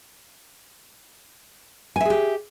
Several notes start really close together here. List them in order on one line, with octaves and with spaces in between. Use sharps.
G#5 E5 G#4 G4